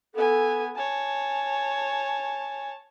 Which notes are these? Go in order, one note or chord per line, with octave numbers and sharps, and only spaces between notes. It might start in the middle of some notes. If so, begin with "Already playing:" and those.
B3 A4 G#5
C#5 G#5 A5